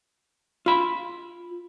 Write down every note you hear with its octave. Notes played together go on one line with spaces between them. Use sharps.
F4 B5